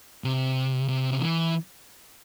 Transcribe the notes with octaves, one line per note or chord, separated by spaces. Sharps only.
C3
C3
C#3
E3